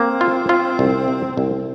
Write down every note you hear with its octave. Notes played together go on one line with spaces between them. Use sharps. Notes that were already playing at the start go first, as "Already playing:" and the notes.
Already playing: A#3 C4
F4
F4
C2
C3
C2